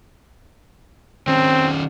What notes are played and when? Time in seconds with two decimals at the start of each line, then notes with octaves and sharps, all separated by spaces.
1.27 D#3 C4 C#4